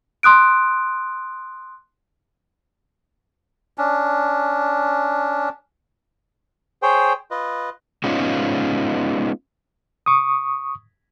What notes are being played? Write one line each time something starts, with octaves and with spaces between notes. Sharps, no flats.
C6 D#6 F#6 D7
C#4 D4
G#4 C5 C#5 G5
F4 B4 D#5
G#3 B3 C#4 D#4 F4
C#6 D#6